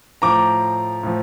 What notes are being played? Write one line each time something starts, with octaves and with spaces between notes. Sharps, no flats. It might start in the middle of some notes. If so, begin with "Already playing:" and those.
A2 F3 A#5 D6
A2 F3